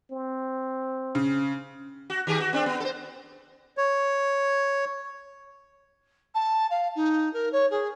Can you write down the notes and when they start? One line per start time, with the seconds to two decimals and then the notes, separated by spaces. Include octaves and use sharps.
0.11 C4
1.15 C#3
2.10 F#4
2.27 D#3 G4 G#4
2.40 F#4
2.53 C4 D4
2.66 B3
2.80 A4 C5
3.77 C#5
6.34 A5
6.70 F5
6.95 D#4
7.33 A#4
7.52 C#5
7.70 G#4